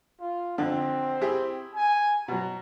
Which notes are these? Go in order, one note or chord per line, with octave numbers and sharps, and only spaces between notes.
F4
F2 D3 C4
E4 G4 G#4
G#5
B2 F#3 A#5